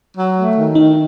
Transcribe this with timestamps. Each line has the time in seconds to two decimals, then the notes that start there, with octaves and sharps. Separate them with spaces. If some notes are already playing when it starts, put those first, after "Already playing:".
0.14 F#3
0.35 A3
0.55 D#3
0.75 D#3 D#4